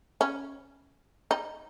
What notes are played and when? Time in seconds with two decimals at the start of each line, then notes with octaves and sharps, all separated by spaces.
0.21 C#4
1.31 D#4